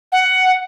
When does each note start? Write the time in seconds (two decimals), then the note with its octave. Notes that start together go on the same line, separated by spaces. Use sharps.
0.12 F#5